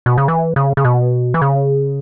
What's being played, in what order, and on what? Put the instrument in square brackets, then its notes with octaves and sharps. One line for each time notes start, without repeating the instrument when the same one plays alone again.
[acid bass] B2
C#3
E3
C#3
C#3
B2
E3
C#3